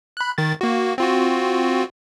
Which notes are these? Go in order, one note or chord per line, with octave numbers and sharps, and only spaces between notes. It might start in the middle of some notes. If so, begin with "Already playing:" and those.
B5 F#6
D#3 A6
A#3 F#4
C4 F4 F#4